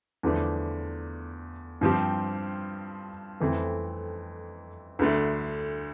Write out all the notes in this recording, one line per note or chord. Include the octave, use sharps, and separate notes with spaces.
E2 D3 F3 A3 D4
G2 F3 C4 G4
F2 E3 A3 C4
D2 D3 A3